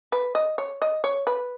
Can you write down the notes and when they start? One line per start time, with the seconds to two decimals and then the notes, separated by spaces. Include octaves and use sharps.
0.12 B4
0.35 D#5
0.58 C#5
0.82 D#5
1.04 C#5
1.27 B4